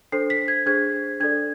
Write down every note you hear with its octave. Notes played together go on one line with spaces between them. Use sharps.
D4 A4 C5 C7
B6
G#6
D4 G#4 C5 G#6
D4 A4 D5 G#6